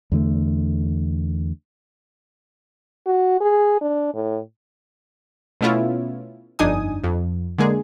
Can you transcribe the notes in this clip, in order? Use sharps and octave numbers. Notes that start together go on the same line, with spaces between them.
E2 D3 A3
F#4
G#4
D4
A2
B2 A3 B3 C#4 E4 F4
G1 F2 D4 D#4 G#5 D#6
F2
D3 G#3 A#3 G#4